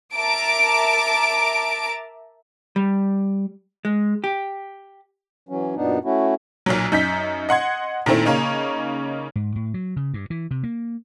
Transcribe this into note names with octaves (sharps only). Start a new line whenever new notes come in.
A#4 E5 A5 A#5 D6 D7
G3
G#3
G4
E3 F#3 C#4
F#2 A#2 B3 D4 D#4
A3 C#4 E4 F#4
B1 A#2 F#3
F#2 D#4 G6 B6
D#5 F#5 C6 G#6
A#2 D#3 A3 C4 E4
C#3 A#3 C#4 D#4
G#2
A2
F#3
C#3
G2
E3
C3
A#3